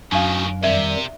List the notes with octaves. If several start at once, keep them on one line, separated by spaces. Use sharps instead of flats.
F#2 A2 D#3 C#4 D4 F#4 F5
F2 C3 D#3 G3 D5 E5